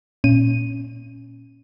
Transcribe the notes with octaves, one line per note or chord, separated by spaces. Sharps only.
A#2 C#4 D#7